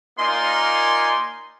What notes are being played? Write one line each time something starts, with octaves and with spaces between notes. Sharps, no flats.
A#3 D#4 F4 D5 G#5 C6